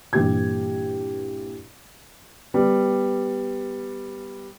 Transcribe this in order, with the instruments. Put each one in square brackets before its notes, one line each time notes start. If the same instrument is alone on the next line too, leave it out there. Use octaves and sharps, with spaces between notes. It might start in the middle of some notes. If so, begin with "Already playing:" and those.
[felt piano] G2 A#2 E3 G4 G#6
[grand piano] G3 B3